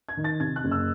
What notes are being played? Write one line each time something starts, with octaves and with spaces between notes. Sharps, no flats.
G#6
D#3
A6
C3 G#6
F#6
F#1
E6